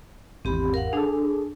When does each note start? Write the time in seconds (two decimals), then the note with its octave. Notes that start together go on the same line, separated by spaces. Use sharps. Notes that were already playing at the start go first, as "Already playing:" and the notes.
0.45 G#1 E2 C4 G4 B5
0.74 A#4 F5 F#5
0.93 D4 G#4 A4